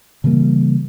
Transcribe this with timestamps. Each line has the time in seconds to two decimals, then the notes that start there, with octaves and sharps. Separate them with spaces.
0.24 C#3 E3 G3 A#3